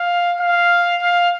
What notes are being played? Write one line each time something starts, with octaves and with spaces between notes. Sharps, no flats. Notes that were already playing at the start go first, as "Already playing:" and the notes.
Already playing: F5
F5
F5